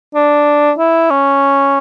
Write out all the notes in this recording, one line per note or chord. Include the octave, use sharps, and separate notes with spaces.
D4
E4
C#4